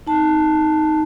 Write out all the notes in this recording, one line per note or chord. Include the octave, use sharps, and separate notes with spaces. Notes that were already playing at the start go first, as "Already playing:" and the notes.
D#4 A5